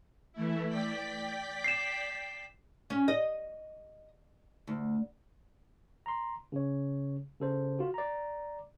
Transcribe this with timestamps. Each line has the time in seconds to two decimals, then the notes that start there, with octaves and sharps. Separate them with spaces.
0.33 E3 A3 E4
0.68 D5 G5 B6
1.64 C7 E7
2.90 C#4
3.08 D#5
4.67 D2
6.06 A#5 C6
6.52 C#3 C#5
7.40 C#3 A4 C5
7.79 F4 F#4
7.94 D5 A#5